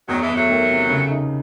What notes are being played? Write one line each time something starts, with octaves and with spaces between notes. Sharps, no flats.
E2 D#3 F#3
E3 G#3
E2
F#3 A3
D#3
C3
C#3
D#4